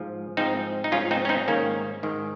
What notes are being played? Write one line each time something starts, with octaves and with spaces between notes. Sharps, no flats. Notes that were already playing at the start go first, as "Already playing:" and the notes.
Already playing: G#2 F3
G#2 F3 C4 D#4
D#4
G#2 F3 C#4 F4
C4 D#4
C#4
C4 D#4
G#2 D#3 A#3 C#4
G#2 D#3